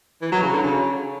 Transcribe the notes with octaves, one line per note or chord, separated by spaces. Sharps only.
E3
F#3
C#3
D3
C#3